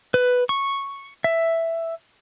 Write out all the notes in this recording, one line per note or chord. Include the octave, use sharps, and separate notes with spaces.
B4
C#6
E5